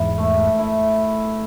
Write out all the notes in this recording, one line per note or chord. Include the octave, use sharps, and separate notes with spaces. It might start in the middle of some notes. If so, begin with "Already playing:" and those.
Already playing: E2 G#2 E4
A3
E4